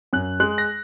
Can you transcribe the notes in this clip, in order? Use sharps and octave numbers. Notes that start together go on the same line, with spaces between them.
F#2 F#6
G#3 F#6
A#6